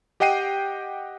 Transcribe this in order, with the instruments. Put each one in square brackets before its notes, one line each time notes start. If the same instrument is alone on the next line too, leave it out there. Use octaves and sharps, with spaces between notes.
[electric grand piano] G4 D#5 F#5 G5 C7 D#7